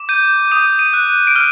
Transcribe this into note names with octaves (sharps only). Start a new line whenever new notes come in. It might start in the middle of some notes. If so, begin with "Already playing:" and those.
Already playing: D6
G6 D#7
D#6 D#7
D#7
F#6
D7
F6 D#7